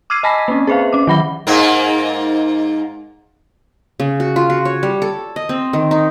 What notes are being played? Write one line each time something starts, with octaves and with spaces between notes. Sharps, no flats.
D6 E6 F6 G#6 C7 D#7
D#5 G#5 A5 B5 A#6 B6
A#3 C4 C#4
G#4 B4 C5 E5 F5
C#4 D6
D#3 F#3 F#5 B5 A#6 G7
G#2 A#3
C#3
F#4
F4
F#4
C#5
G3
A4
D#5
C4
D#3
D#4